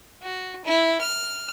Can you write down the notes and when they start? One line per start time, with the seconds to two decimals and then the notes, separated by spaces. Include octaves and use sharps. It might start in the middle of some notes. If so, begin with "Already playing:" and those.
0.22 F#4
0.65 E4
1.01 F6